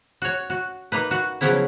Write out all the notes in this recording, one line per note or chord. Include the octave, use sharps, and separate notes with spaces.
F#4 C#5
F#4
A#3 D#4 B4
F#4
C#3 F3 F#3 B3 C#4 E4